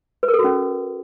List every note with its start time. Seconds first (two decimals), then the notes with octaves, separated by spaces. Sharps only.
0.23 B4
0.28 A#4
0.34 A4
0.39 F#4
0.44 C#4